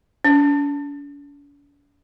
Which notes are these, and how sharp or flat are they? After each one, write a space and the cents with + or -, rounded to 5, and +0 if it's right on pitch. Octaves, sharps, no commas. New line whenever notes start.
D4 -45